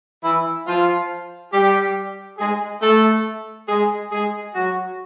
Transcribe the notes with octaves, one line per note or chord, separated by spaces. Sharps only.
E3 E4
F3 F4
G3 G4
G#3 G#4
A3 A4
G#3 G#4
G#3 G#4
F#3 F#4